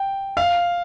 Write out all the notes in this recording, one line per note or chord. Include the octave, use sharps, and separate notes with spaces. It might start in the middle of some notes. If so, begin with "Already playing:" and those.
Already playing: G5
F5